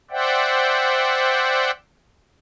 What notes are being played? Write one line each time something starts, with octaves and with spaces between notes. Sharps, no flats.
C5 D5 E5 F#5 G5